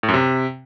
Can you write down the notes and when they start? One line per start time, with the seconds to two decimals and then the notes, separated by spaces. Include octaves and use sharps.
0.03 A2
0.08 F#2
0.14 C3